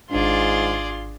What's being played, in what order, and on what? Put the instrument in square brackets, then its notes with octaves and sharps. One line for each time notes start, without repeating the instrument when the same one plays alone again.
[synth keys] G#1 D4 [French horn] G#2 [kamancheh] F4 C6 [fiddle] G#4 D5